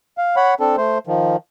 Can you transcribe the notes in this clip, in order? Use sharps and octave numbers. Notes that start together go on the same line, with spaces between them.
F5
C#5 F#5 B5
C4 D4 A4
A3 C5
D#3 F3